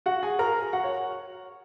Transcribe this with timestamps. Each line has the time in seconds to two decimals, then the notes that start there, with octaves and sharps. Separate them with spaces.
0.06 F#4 F#5
0.23 G#4 G#5
0.39 A#4 A#5
0.73 F#4 F#5
0.84 C#5